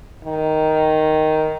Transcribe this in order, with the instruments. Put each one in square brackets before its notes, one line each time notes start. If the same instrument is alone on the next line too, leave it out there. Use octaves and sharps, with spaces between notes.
[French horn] D#3